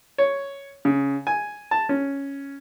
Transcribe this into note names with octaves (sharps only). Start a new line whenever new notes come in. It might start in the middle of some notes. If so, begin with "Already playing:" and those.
C#5
C#3
G#5
A5
C#4